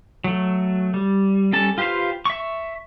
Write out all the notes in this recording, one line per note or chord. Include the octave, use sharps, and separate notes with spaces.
F#3 A3
G3
G3 C#4 A4 A5
F4 G4 B4 C5 F5
E5 C#6